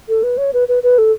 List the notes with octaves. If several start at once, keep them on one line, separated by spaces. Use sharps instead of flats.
A4
B4
C#5
B4
B4
B4
A4